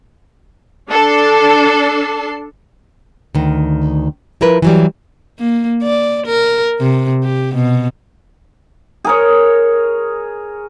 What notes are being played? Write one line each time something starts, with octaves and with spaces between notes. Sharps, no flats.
D4 A4 C7
D2 D#3
F3 E4 A#4 B4
E3 F#3 G3
A#3
D5
A#4
C3
G4
B2
G#4 A#4 C#5